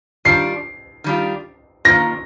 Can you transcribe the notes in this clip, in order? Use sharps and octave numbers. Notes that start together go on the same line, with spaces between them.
D#3 G3 D4 F4 C7
D#3 G3 D4 F4
D#3 A#3 D4 F4 A#6